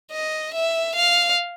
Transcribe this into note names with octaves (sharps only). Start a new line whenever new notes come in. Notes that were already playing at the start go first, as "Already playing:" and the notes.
D#5
E5
F5